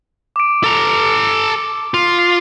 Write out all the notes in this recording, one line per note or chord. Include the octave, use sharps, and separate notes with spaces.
D6 D7
A4 A#5
F4
C7